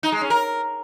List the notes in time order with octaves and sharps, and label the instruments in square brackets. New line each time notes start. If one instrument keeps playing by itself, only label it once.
[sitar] D#4
G#3
C#4
A#4